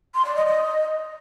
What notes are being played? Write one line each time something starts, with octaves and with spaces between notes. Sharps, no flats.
C6
D5
D#5
D#5